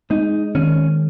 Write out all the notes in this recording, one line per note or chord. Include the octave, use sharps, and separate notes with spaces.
G#3 D#4
D#3 C#4